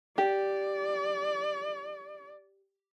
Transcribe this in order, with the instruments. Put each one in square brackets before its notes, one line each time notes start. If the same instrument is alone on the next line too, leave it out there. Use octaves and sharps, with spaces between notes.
[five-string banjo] G4 [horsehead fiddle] D5